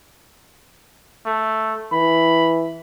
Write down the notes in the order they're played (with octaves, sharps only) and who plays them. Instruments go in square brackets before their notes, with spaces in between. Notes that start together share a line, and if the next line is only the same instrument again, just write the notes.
[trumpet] A3
[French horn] E3 [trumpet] B5